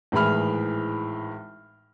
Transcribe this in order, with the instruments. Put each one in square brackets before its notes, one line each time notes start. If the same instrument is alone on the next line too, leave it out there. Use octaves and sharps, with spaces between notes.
[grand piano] G#1 A2 E3 G#4 B5 F6